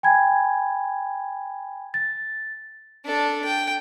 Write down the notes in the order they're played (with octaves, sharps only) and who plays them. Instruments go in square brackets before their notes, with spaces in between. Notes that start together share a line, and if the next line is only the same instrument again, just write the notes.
[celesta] G5 G#5 B5 G#6
A6
[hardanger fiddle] D4 A4
G5